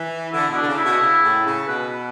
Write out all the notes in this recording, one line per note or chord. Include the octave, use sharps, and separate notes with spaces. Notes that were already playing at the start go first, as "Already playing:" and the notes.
Already playing: E3
D3 E4
B2
D4
D3
C#3
E4
B2
C#3
A2
C#3
B2 B4